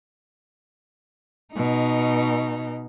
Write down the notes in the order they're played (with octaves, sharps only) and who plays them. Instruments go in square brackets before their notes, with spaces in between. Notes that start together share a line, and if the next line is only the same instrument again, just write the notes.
[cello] B2 D#4